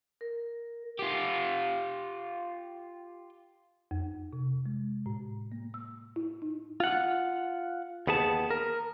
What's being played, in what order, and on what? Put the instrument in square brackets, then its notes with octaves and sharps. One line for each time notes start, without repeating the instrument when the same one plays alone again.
[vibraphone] A#4
[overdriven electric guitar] F4 G4
[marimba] F2
C3
G#3
A2
A#3
E6
E4
D#4
[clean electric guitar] F4 F#5
D#2 B3 G#4 A5
A#4